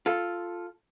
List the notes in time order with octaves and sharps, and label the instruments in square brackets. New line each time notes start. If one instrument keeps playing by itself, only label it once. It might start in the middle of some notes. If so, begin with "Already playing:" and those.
[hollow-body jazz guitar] F4 A4